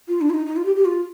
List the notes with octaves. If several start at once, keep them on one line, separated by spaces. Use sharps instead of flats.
F4
D4
F4
D#4
D#4
F4
G4
G4
F4